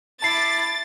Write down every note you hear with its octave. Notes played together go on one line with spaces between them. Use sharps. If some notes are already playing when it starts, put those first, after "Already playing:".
E4 A5 D6 A6 C7